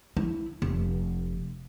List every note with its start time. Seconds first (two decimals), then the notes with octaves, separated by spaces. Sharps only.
0.17 E4
0.62 F1